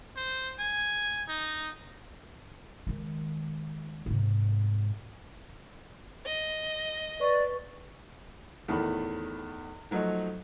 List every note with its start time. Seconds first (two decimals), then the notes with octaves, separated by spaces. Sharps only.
0.17 C5
0.59 G#5
1.29 D#4
2.87 D#3 G#3
4.06 G#2 C3
6.25 D#5
7.20 B4 D5 C#6
8.68 E2 A2 D#3 A3 B5
9.91 F3 F#3 A3 D#4